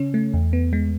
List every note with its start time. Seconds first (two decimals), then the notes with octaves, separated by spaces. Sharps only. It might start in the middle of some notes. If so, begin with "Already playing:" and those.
Already playing: C#3 C#4
0.14 A3
0.34 E2
0.53 B3
0.73 G#3